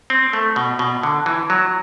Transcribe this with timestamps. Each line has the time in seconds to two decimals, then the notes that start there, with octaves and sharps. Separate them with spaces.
0.10 C4
0.33 A3
0.56 B2
0.79 B2
1.03 D3
1.26 E3
1.50 F#3